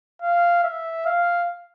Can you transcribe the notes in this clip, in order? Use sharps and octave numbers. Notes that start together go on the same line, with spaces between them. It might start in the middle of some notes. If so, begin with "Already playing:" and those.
F5
E5
F5